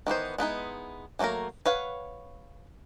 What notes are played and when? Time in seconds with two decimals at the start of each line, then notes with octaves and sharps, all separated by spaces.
0.07 D#3 E3 B3 C5
0.38 G#3 B3 D#4 E4
1.19 E3 F#3 A3 A#3 A#4
1.66 B4 C#5 F5 F#5